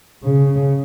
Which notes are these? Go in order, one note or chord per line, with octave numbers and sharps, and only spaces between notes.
C#3